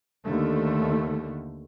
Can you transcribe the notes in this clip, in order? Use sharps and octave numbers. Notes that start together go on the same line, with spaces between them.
D#2 D3 A3